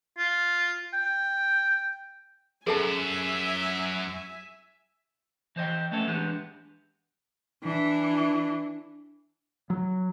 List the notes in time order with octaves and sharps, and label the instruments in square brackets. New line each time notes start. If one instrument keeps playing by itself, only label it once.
[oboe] F4
G5
[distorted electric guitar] F#2 [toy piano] G#4 A4 A5 [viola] E5 G#5
[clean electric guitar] E3 C5 D#5 G5
A3 B3 C#4 A4 C#5 E5
E3 G#3 B3 D4 G4
[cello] E3 D4
[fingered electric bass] F#3